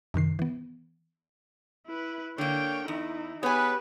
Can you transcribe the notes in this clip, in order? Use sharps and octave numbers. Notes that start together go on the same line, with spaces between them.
F#2 C3 D#3 C7
E3 B3
E4 B4
D3 A#3 C#5 G5
E2 D#4 E4
B3 G4 G#4 B4 C#5 G#5